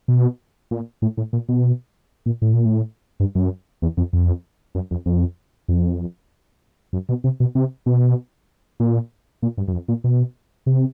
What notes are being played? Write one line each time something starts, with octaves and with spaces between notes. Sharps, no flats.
B2
A#2
A2
A2
A#2
B2
A#2
A2
A#2
A2
G2
F#2
E2
F2
F2
F#2
F2
F2
F2
F#2
B2
C3
B2
C3
B2
A#2
A#2
G2
F#2
F2
A#2
B2
C3